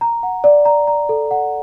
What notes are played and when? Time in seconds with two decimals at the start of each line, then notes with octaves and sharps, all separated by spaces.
0.01 A#5
0.23 F#5
0.44 D5
0.65 A#5
0.87 A#5
1.09 A4
1.31 F#5